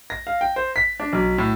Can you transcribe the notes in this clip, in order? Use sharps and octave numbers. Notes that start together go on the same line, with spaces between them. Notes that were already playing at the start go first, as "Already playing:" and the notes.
A#6
F5
G5
C5
B6
D4
B1
A2